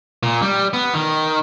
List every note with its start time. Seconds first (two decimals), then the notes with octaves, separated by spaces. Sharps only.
0.23 A#2
0.42 G3
0.73 B3
0.94 D#3